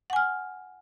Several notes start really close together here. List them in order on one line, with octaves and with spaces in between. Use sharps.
F#5 G#5 F6